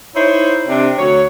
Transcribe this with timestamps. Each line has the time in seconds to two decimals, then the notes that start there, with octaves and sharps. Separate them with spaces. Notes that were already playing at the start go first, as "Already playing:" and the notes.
0.15 D#4 E4 C5 C#5
0.68 C3 D4
0.98 D2 F#3 C#5